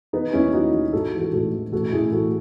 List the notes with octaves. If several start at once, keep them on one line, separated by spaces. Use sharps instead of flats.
D#3 B3 D#4
D#2 C#4 E4
D#3 D#4 F#4
D#3
G#2 F#4 A4
E3
F#4 A4
A1 F#4 A4
E3
A1 F#4 A4
A1 E4 G#4
A1 F#4 A4